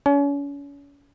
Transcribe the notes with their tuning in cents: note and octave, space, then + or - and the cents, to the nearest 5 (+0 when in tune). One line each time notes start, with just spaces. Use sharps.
C#4 +35